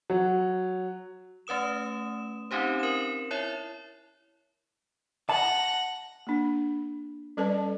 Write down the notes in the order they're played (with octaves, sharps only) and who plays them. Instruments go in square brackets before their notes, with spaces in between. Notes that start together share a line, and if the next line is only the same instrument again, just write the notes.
[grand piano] F#3
[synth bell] A3 C#4 B4 D#6 E7
C4 C#4 D#4 G4 C5
A#4 E7
E4 C#5 E5
[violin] F#5 A#6 [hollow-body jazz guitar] A5
[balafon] A#3 D4
G3 C#4 A4 B4 D5 A5